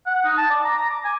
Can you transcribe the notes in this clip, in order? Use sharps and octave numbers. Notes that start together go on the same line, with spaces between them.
F#5
D#4
A5
D5
A#5
A#5
D6
G#5